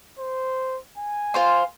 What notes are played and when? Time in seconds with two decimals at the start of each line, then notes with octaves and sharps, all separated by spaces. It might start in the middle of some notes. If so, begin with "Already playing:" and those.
0.19 C5
0.98 G#5
1.34 F4 C5 C6